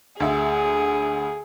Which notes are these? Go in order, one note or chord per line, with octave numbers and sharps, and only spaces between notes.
D2 G#4 E5